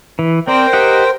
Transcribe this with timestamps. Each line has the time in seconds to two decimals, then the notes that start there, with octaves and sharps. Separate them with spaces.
0.19 E3
0.47 C4 A#4 C5 D5 G5
0.73 G4 D#5 F#5